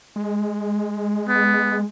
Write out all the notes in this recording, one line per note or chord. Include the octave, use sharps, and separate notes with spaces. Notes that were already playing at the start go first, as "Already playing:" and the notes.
G#3
B3